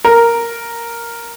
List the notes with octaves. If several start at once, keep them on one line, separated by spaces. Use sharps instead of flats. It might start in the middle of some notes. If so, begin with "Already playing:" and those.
A#4